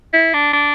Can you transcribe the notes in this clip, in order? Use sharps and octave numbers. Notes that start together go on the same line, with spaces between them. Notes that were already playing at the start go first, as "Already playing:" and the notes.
E4
D4
D4